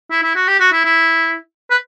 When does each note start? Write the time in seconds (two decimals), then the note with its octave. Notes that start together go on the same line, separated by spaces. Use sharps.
0.11 E4
0.23 E4
0.36 F#4
0.48 G4
0.60 F#4
0.72 E4
0.85 E4
1.70 B4